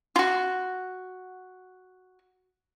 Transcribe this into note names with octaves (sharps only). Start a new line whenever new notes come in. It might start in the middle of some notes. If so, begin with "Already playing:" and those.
F4 F#4